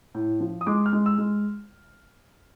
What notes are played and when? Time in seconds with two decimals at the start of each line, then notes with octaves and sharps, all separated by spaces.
0.15 A2
0.40 F3
0.61 D#6
0.66 G#3 D6
0.86 F6
0.93 G#3
1.06 E6
1.18 G#3